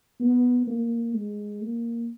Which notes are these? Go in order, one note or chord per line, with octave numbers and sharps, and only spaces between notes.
B3
A#3
G#3
A#3